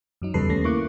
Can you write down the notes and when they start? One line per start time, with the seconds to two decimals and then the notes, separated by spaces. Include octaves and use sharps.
0.22 F#2 F#3 D#4
0.34 E2 C#3 G3 A4 B4 C7
0.49 D#2 A3 C#4 A#6
0.64 A#3 E4 C#6 D6 F#6